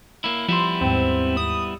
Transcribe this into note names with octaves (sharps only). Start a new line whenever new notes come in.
A#3 E4
F3 G3 B3 E4 C6
D#2 G#2 C4
D#6